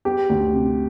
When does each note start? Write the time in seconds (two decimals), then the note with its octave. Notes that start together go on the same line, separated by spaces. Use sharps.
0.05 B3 G4
0.30 D2
0.53 C3